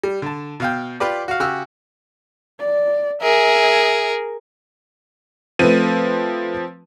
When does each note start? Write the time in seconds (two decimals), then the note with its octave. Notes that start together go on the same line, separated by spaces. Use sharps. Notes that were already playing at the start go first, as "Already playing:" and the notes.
0.04 G3
0.22 D3 A5
0.60 B2 F5 G5
1.00 F4 G4 B4 D5
1.28 F#4 F5
1.40 C#3 F#4 G4 F#5 E6 F6
2.60 D5
3.21 G#4 A#4 E5 G#5
5.59 F3 A3 C4 B4 D#7